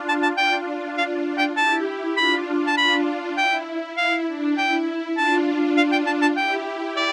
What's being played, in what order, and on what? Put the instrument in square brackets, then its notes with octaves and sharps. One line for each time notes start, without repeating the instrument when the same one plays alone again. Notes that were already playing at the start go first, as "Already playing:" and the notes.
Already playing: [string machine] D4 F4
[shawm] A5
A5
[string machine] D4 F4 [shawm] G5
[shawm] F5
G5
[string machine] E4 G4 [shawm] A5
[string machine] D4 F4 [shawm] B5
[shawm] A5
[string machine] D4 F4 [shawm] B5
[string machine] E4 [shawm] G5
[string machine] E4 [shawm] F5
[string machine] D4
[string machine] E4 [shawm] G5
[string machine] D4 F4 [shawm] A5
[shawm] F5
G5
A5
A5
[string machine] E4 G4 [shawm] G5
[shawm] D5